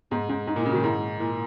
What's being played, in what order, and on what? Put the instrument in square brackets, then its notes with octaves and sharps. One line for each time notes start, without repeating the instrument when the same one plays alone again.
[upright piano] G#2 [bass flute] B3
[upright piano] G#2 [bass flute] C#4
[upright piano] G#2 [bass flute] D#4
[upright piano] A#2
[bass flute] E4
[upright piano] C#3
[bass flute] F#4
[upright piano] D#3
[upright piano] G#2 [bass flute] E4
[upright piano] A#2 [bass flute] E4